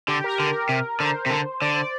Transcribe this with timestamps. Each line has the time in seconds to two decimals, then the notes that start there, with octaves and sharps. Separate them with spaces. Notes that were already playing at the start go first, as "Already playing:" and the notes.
0.08 D3 G4
0.24 A#4
0.40 D3
0.69 C3
1.00 D3 C5
1.26 C3
1.30 D3
1.62 D3 D5
1.76 D5